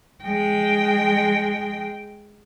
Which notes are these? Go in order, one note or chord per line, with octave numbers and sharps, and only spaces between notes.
G#3 G5